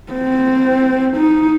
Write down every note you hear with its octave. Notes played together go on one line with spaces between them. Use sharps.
C4
D#4